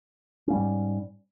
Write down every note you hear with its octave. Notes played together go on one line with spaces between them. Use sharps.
G#2 G3 A#3 C#4